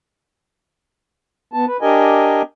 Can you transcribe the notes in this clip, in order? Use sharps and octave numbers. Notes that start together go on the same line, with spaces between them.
B3 A5
B4
D4 G4 A#4 D#5 G#5